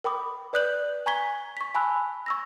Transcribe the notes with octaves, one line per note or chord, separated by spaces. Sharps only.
A#4 G5 B5 D6 D#6
B4 D5 D#6 F#6 G6 F#7
G#5 A#5 C#6 G#6 B6 G7
C#6 B6
G#5 A5 B5 C6 E6 F#6
C#6 E6 A#6